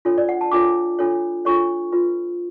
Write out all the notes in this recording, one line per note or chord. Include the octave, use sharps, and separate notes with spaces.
D4 F4 A4 C#5
D5
F#5
A5
D4 F4 A4 C#5 D6
D4 F4 A4 C#5
D4 F4 A4 C#5 C#6
F4 B4